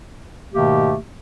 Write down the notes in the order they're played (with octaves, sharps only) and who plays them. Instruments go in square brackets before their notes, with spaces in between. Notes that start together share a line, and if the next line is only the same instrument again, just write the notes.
[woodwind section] G#2 B2 D#3 A3 A#3 G4